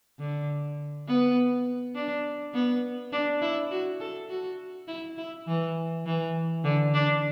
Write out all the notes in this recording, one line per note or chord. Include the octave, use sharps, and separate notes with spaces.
D3
B3
D4
B3
D4
E4
F#4
A4
F#4
E4
E4
E3
E3
D3
D4